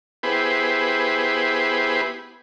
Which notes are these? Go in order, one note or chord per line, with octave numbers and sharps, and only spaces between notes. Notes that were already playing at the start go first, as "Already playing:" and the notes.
B3 E4 G4 G#4 B4 C5